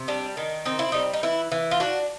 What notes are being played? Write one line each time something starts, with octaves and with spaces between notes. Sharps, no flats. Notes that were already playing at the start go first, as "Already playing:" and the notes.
Already playing: C3
G3 D4
D#3
C4 D#4
E4
G3 D#4
D#4
E3 E4
E3
F4
D4 F#4